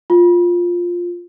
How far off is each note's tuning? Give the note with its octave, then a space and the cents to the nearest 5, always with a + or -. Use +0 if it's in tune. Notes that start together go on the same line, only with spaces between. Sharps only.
F4 +5